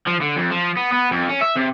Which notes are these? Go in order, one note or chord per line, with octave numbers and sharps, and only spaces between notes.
F3
D3
F2
F3
B3
B3
F2
C#4
E5
C3